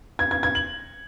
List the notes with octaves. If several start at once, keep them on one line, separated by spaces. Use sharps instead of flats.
G#6
G#6
G#6
F#7